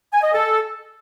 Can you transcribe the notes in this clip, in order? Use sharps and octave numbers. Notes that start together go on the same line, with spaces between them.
G#5
D#5
A4